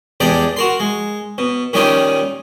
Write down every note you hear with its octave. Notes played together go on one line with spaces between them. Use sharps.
E2 G#3 G4 D5 A5
F#4 A#4 C6
G#3
B2
A#2 D#3 G3 C#4 D#4 G4